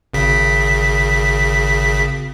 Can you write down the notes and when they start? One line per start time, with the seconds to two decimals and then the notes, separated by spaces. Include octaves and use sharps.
0.14 G#1 C#3 B6